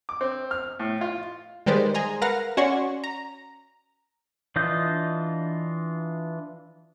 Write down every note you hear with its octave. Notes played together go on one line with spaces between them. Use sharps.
D6
C4
F6
A2
F4
D#3 G3 G#3 B4 C5 D5
G#4 A#5 C6
A#4 B4 F5 F#5 F6 A#6
C#4 F#4 C#5 D5 C6 C#6
A#5
E3 D4 F4 D#5 G6